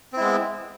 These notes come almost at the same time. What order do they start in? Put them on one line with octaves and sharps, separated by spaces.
C4 E4 G#3 B3